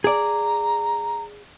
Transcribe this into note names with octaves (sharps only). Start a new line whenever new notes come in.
G#4 D5 A#5